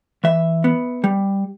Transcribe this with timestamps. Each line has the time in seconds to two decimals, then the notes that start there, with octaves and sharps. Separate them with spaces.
0.24 E3 E5
0.64 B3
1.04 G3